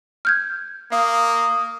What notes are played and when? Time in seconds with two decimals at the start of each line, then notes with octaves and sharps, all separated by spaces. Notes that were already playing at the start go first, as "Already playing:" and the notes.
0.25 F6 G6 G#6
0.92 A#3 F5 D#6